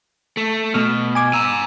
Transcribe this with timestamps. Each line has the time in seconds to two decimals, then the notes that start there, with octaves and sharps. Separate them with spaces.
0.37 A3
0.74 B2 A3 F6
1.15 G#5 D6 G#6
1.34 G#5 A#5 E6